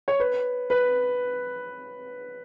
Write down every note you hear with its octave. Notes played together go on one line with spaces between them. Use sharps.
C#5
B4
B4